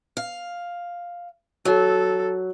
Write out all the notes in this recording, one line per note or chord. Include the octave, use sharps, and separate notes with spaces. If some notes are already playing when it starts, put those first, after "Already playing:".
F5
F#3 A4